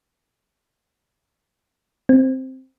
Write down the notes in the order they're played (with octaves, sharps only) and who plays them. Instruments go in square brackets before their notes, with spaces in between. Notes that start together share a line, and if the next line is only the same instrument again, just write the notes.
[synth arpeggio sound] C4